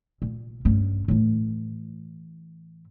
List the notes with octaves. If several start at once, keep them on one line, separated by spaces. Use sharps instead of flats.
A#2
G2 C#4
A2 E3